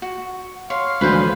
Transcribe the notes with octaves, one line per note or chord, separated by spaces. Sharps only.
F#4
C#5 F5 C6
D2 E3 F3 G#3 B4 C5 G#5